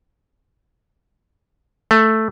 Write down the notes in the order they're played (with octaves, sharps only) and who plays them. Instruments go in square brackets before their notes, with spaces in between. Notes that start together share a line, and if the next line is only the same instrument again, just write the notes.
[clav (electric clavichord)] A3